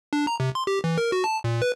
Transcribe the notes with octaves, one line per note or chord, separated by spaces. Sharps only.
D4
A#5
C3
C6
G4
E3
A#4
F#4
A5
A#2
B4